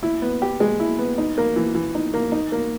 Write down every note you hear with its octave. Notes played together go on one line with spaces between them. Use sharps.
E4
B3
G4
G#3
E4
B3
D#4
A#3
E3
E3
D#4
A#3
D#4
A#3